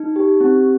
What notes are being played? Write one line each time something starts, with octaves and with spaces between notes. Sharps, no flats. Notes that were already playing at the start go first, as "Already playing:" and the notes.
Already playing: D#4
G4
C4